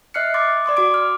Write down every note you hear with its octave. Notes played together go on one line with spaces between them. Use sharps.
D#5 E5 F6 F#6 C7 C#7
C6 D6 A6
D5 C6 D6 D#6
F#4 C6 D6 D7
F6